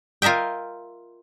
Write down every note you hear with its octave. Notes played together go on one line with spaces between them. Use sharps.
F4 A#4 D#5 E5 G5